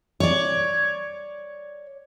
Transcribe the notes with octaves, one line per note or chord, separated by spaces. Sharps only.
C#5 D5